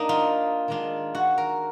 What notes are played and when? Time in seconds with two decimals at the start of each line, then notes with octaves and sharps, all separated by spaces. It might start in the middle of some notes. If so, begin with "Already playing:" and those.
Already playing: A#3 D4 D#4
0.09 F4
0.68 D#3 G#3 D4 F4
1.15 F#4
1.38 A#4